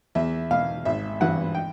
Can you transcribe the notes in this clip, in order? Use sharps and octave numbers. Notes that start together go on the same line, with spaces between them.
E2 E5
B2 F5
G#1 E5
G2 E3 F#5
G5